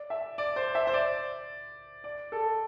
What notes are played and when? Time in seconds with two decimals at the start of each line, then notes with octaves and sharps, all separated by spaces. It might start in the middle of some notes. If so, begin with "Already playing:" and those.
Already playing: D5
0.10 E5
0.38 D5
0.56 C5
0.75 E5
0.87 C5
0.94 D5
2.04 D5
2.32 A4